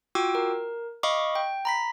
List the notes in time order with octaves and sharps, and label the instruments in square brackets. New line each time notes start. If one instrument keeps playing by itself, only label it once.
[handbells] F4 F#4 G5 D6 E6
A#4
D#5 F5 B5 C#6 D6
G5
A#5 B5 B6